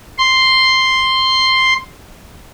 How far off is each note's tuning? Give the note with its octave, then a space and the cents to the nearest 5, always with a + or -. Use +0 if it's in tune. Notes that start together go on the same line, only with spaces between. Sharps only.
C6 +0